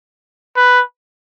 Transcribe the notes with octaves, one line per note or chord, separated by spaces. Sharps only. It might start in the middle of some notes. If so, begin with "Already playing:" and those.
B4